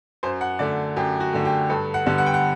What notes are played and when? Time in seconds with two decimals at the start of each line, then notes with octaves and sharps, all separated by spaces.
0.23 F#2 C5
0.41 F#5
0.59 D3 A3 D5
0.96 F#2 G4
1.20 F#4
1.33 D3 A3
1.45 G4
1.70 G2 A4
1.94 F#5
2.06 D3 G3 B3
2.18 F#5
2.26 G5
2.34 F#5